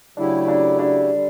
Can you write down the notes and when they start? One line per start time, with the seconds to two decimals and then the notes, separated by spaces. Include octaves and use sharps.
0.17 C#3 F#3 A3 D4 E4 G4
0.48 D4
0.79 D4
1.11 D3 G3